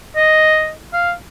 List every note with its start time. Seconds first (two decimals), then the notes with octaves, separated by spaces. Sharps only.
0.16 D#5
0.93 F5